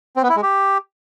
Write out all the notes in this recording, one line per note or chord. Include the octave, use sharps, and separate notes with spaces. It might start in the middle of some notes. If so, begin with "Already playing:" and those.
C4
B3
E4
G#3
G4